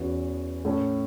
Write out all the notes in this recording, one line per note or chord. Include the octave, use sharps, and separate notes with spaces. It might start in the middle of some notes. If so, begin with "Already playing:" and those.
Already playing: E2 E3 C#4 F#4
A2 A3 C#4